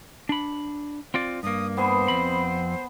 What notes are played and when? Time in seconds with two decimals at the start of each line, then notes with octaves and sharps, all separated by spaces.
0.29 D4 B5
1.14 C4 F4 D5
1.43 G2 A#3 D#6
1.77 B3 B4 C5 G#5
2.08 F2 C4 B5